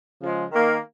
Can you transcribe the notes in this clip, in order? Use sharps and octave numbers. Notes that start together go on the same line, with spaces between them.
C#3 F3 G#3
D#3 A#3